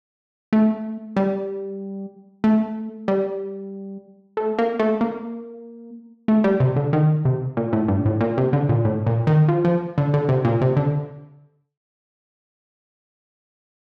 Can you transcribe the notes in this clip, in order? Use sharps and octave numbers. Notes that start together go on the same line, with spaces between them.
A3
G3
A3
G3
A3
A#3
A3
A#3
A3
G3
C3
D3
D#3
C3
A#2
A2
G2
A#2
A2
A#2
C3
D3
A#2
A2
A#2
D#3
F3
F3
D3
D3
C3
A#2
C3
D3